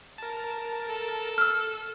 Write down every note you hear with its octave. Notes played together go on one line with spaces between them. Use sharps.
A#4 A5
A4
E6 F6